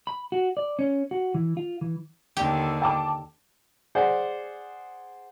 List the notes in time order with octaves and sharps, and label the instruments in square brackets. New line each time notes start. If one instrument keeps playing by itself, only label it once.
[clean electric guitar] B5
F#4
D5
C#4
F#4
E3
F4
E3
[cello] D#2 D3 [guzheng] G4
[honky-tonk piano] G5 A5 D6
[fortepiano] G#4 C5 D5 F#5